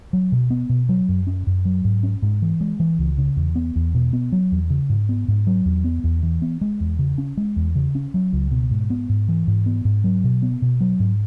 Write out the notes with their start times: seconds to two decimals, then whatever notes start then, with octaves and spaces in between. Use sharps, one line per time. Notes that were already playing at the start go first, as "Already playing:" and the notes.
0.13 F#3
0.32 B2
0.50 B3
0.69 B2
0.89 F#3
1.09 F#2
1.27 C#4
1.47 F#2
1.65 F#3
1.85 G#2
2.03 C#4
2.22 G#2
2.42 E3
2.61 G#3
2.80 E3
2.99 C#2
3.18 C#3
3.36 E2
3.56 B3
3.76 E2
3.95 B2
4.13 B3
4.32 F#3
4.52 E2
4.70 C#3
4.90 G#2
5.09 B3
5.28 G#2
5.47 F#3
5.65 E2
5.84 B3
6.04 E2
6.23 E3
6.42 B3
6.61 G#3
6.80 E2
6.99 C#3
7.18 C#4
7.37 G#3
7.56 E2
7.75 C#3
7.95 C#4
8.14 F#3
8.33 C#2
8.52 B2
8.71 G#2
8.90 B3
9.09 G#2
9.28 E3
9.48 G#2
9.66 B3
9.85 G#2
10.04 F#3
10.24 B2
10.42 B3
10.62 B2
10.81 F#3
11.00 G#2